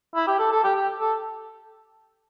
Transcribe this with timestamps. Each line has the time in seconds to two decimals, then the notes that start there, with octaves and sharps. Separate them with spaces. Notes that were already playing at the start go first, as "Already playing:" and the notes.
0.15 E4
0.27 G4
0.39 A4
0.51 A4
0.64 G4
0.75 G4
1.00 A4